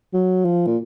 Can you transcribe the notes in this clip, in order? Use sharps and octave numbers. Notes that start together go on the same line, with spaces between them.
F#3
F3
A#2